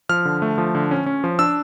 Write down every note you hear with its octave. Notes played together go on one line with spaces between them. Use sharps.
F3 F6
D3
A3
F3
D3
C#4
C#4
F3
D4 E6